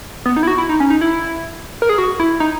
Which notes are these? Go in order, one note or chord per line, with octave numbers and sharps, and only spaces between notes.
B3
D#4
E4
F#4
E4
D#4
C#4
D#4
E4
A#4
G#4
F#4
E4
D#4